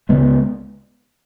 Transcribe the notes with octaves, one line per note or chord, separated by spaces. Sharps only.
C#2 C#3 G#3 B3